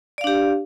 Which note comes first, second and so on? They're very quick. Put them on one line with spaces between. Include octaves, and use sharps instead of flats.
D5 F5 D4 G4